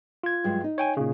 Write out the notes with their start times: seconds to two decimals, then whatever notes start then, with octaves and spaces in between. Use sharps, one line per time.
0.23 F4 G#6
0.44 G2 F#3 G#3
0.64 D#4
0.78 C#5 G5 G#5
0.97 A#2 C#3